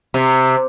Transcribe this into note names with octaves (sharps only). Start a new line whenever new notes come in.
C3